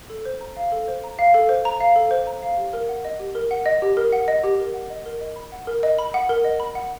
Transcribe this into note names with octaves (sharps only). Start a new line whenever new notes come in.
A4
C5
A#5
F5
A4
C5
A#5
F5
A4
C5
A#5
F5
A4
C5
A#5
F5
G4
A#4
F#5
D#5
G4
A#4
F#5
D#5
G4
A#4
F#5
D#5
G4
A#4
F#5
D#5
A#4
D#5
B5
F#5
A#4
D#5
B5
F#5
A#4
D#5
B5
F#5